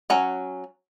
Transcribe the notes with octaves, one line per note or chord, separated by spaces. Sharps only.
F#3 C#4 F#5